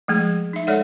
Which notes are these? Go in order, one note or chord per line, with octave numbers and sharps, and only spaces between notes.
F3 G#3 A3 G#4
D#4 E5
G#3 A4 C#5 D5 E5 F#5